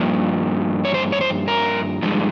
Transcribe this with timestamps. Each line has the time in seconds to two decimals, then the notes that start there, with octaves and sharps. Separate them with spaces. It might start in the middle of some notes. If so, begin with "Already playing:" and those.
Already playing: G2 F3 A#3
0.85 C#5
0.94 C5
1.13 C#5
1.21 C5
1.48 A#4
2.02 G2 F3 G#3